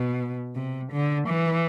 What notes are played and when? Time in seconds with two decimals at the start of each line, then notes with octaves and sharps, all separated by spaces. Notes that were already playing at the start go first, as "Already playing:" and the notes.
Already playing: B2
0.55 C3
0.92 D3
1.28 E3